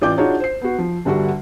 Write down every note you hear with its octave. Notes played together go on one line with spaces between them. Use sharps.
A1 F4 D5 D6 G6
D4 D#4 F4 F#4 G#4 C#5
C5 C7
B3 F#4
F3
G1 D3 G3 F#4 F#5